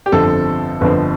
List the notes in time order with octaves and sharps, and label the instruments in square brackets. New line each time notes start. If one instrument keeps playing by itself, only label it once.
[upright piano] G4
[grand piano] G1 F2 D3 F3 C4 [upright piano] A4
[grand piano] G1 F2 D3 F3 C4 [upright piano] B4